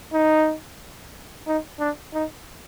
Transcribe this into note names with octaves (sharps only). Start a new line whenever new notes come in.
D#4
D#4
D4
D#4